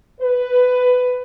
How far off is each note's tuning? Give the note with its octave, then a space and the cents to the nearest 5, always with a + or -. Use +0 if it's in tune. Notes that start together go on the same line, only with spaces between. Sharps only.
B4 +15